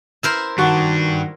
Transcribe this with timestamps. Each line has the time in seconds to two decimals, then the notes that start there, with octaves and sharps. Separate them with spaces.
0.23 E4 A#4 C5
0.58 G2 D#3 D4 F#4